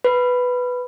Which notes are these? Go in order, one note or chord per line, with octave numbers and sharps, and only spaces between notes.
B4